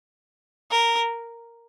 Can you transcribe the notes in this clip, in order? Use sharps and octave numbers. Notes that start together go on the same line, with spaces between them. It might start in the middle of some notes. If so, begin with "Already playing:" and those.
A#4